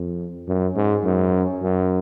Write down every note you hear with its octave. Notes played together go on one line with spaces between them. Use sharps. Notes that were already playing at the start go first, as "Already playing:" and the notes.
Already playing: F2
F#2
G#2
F#2
F#2